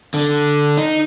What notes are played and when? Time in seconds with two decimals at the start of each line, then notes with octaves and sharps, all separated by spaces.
0.14 D3
0.77 D#4